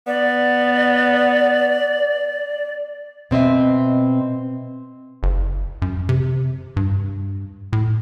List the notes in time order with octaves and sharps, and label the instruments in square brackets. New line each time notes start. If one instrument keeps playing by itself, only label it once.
[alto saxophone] B3 [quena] D5
[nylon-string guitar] B2 C4 D#5 E5
[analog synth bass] F#1
F#2
C3
G2
A2